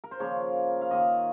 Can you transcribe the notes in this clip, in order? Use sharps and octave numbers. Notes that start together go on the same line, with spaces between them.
A#4
C5
C#3 F3 A#3 C#5
F5
D#3 A#3 F4 D#5